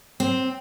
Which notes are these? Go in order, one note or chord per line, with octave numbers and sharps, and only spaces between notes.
C4